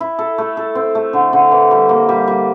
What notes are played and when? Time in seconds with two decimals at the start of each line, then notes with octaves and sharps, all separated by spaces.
0.01 E4
0.19 A4
0.38 A3
0.57 A4
0.75 C4
0.95 A3
1.13 D3
1.33 D3
1.51 E3
1.71 G3
1.89 A#3
2.09 G3
2.28 G3